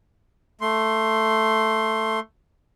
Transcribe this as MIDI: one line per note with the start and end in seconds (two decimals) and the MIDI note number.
0.61 2.20 57
0.61 2.20 84